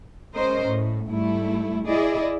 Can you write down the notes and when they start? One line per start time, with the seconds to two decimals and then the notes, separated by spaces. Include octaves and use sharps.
0.34 G#3 C#4 A#4 C5 D#5
0.67 A2
1.09 G#2 G3 A3 E4
1.87 E4 G#4 D5 D#5